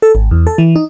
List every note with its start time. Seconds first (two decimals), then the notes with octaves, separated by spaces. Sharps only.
0.02 A4
0.15 G#1
0.31 E2
0.47 A4
0.58 E3
0.76 D#4